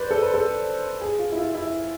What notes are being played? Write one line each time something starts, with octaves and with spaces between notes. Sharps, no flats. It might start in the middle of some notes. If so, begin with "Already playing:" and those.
Already playing: B4 C5 D5
A4
B4
A4
G#4
F4
E4
F4
E4